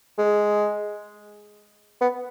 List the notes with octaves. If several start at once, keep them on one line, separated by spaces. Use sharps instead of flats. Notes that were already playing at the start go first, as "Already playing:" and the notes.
G#3
B3